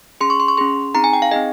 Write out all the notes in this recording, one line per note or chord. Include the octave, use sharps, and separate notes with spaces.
C#4 G#4 C6
C#6
C6
C#6
C#4 G#4 C6
C4 D#4 G#4 A#5
G#5
G5
F5
C4 D#4 G#4 D#5